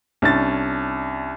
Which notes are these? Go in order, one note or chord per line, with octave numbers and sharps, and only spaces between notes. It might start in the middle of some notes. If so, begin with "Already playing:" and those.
C2 C#4 D4 A6